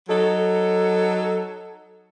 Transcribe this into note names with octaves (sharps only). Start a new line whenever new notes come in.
F#3 D#4 A4